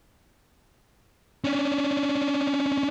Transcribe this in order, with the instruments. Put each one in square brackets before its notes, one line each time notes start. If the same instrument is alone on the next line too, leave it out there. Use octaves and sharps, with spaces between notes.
[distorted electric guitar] C#4 D4